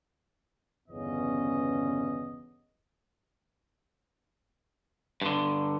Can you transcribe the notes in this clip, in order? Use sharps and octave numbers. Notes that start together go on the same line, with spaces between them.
G1 E2 C#3 B3 C#4 D#5
G2 D3